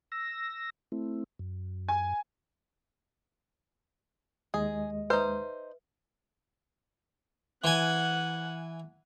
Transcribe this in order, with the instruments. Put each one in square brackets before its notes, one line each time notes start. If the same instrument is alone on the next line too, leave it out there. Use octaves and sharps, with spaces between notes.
[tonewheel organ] E6 A#6
A3 C4 E4
F#2
[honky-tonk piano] G#5
[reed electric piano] D#2 G#3 D#5 [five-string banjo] G#4
[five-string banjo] D#4 C5 [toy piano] B4 E5
[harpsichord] E3 G#5 [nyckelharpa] F#5